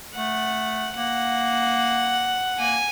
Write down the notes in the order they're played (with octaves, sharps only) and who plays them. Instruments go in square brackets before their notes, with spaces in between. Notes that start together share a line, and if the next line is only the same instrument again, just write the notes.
[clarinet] A3 [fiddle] F#5
[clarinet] A#3 [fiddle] F#5
[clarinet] A#3 [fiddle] G#5